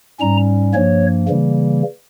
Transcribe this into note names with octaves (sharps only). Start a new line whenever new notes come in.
G#2 G3 C#4 A#5
G2 F3 A#3 C#5
C#3 E3 G3 A#3